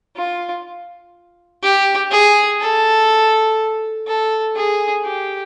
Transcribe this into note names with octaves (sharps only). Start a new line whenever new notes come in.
F4
G4
G#4
A4
A4
G#4
G4